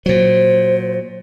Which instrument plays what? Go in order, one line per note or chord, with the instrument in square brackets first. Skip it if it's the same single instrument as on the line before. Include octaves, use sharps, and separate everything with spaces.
[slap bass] A#2 F#3 [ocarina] C5